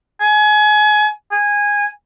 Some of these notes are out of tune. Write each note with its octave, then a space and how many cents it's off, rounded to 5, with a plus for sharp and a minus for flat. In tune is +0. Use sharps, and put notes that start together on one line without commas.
G#5 +30
G#5 -15